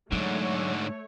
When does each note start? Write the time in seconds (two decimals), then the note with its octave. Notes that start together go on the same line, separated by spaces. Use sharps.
0.12 G#2 D3 F#3 A3 C#5